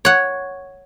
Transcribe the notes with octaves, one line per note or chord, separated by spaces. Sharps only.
C#5 F#5